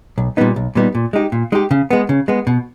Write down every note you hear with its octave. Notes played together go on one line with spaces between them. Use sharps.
B1
A#2 G3 B3 D#4
B1
A#2 G3 B3 D#4
A#2
G#3 D#4 G4
A#2
G#3 D#4 G4
C#3
G#3 B3
C#3
G#3 B3
B2